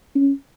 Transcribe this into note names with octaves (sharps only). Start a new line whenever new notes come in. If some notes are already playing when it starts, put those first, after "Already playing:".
C#4